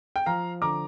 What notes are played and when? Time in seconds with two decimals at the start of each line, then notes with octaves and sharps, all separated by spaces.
0.16 G5
0.26 F3 F5 A#5
0.62 D3 A#5 D6